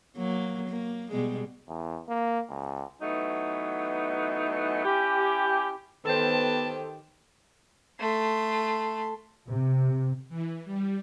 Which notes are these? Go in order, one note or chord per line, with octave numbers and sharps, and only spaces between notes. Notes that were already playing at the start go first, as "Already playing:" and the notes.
F#3 A#3
A#3
B2 G3 G#3
E2
A#3
C#2
E3 F#3 A3 B3 D#4
C#4 E4 G4
D#3 B3 G4 A4 B4 C5 A5
A3 C6
C3
E3
G3